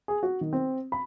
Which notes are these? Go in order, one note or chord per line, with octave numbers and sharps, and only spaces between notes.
G#4
F#4
D#3
C4
B5